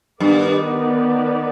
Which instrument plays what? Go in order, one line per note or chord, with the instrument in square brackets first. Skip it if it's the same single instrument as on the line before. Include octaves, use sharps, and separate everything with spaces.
[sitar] G2 [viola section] D#3 B3 D#4 B4 D5